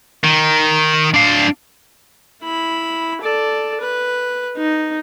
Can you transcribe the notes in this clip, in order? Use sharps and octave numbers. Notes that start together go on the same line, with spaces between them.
D#3
D4 F5
E4 B5
A4 D5
B4
D#4